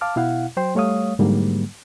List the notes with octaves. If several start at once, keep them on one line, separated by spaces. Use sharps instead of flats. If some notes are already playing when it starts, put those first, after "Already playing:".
F5 A5 D6 F6
B2 E4 F5 F#5
F#3 C5 G5 C6
G3 A3 C#5 F5 D#6
G#2 D3 F#3 G3 A#3